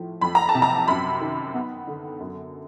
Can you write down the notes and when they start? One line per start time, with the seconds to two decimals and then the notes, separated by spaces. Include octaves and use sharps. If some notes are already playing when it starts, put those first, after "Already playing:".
Already playing: A2 F3
0.21 F2 B5
0.35 A#5
0.49 A5
0.54 C3
0.62 A#5
0.88 F#2 B5
1.21 D#3
1.54 B3
1.87 D3
2.20 F#2